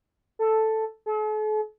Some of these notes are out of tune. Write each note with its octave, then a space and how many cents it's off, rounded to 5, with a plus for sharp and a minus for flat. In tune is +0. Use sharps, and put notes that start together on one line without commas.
A4 +0
A4 -45